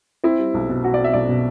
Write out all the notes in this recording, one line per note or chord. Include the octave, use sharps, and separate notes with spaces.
C4 E4
G3
B1
B2
B2 F#4
D5
C4
E5
B1 D5
B2